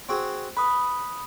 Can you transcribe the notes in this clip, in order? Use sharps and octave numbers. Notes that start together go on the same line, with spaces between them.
C4 F#4 G#4
B4 B5 D#6